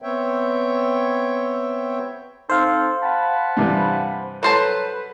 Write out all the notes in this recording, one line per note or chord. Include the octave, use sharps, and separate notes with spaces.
B3 C4 C#5 E5 G5
C4 D#4 A4 C5 F5
F#5 A5 B5
G2 C3 E3
F#3 A4 B4 C5 A5